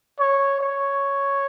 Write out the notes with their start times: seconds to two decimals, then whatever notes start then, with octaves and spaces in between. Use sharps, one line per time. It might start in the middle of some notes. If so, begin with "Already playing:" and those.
0.19 C#5
0.60 C#5